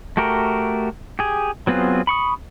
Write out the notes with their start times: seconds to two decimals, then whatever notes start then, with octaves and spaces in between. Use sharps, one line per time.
0.17 A3 F#4 G4 A#4
1.19 G4 G#4
1.67 F#3 B3 C4 F4 G#4
2.07 B5 C#6 D#6